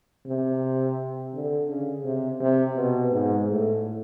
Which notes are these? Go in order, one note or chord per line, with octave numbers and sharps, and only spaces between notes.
C3
D3
C#3
C3
C3
B2
G#2
A2